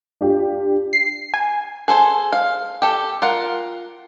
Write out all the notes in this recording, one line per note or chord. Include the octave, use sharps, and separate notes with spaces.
D4 F4 G4
C7
G#5
G#4 A4 C5 G#5
F5
G4 A4
F4 A#4 F#5